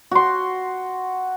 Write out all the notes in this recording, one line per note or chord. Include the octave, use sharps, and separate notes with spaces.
F#4 C6